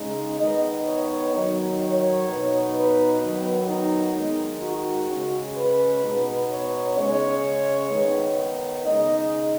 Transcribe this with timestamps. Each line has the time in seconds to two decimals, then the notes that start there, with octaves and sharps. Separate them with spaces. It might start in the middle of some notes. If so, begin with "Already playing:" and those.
Already playing: C#3 G#3 D#4
0.39 D#3 B3 D#4 D#5
0.86 C#5
1.33 D#3 F#3 D#4
1.80 C#5
2.27 B2 B3 D#4
2.74 B4
3.21 D#3 F#3 B3
3.68 D#4
4.15 D#3 G#3 D#4
4.62 F#4
5.09 C#3 G#3 C#4
5.56 B4
6.03 B2 B3 D#4
6.50 C#5
6.97 C#3 G#3 C#4 C#5
7.91 D#3 B3 D#4
8.85 C#3 G#3 D#4 D#5